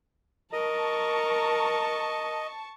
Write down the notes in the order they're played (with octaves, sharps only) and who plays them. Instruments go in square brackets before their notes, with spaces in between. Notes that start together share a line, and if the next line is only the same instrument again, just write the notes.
[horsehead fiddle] A#4 [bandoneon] D#5 [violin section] A5 C#6